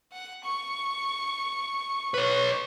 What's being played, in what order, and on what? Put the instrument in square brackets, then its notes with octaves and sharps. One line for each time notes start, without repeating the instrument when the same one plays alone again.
[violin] F#5
C#6
[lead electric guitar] B4 C#5